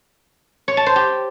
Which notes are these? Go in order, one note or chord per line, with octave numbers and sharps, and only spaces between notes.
C#5
A5
C5
G4